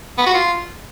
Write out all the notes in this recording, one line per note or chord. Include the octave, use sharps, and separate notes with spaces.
B3
F#4
F4